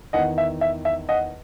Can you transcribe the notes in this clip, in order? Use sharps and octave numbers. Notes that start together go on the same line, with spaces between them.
E2 D#3 D#5 F#5
E5
E5
E5
D#5 F#5